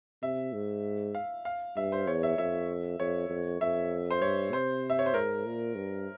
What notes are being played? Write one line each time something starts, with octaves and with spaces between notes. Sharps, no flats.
C3 E5
G#2
F5
F5
G2 E5
C5
E2 C#5
E5
F2 E5
F2 C#5
F2
F2 E5
C5
G2 C#5
C3 C5
E5
C#5
C5
G#2 A#4
A#2
G2